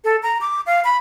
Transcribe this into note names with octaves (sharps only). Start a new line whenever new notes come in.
A4
A#5
D6
F5
B5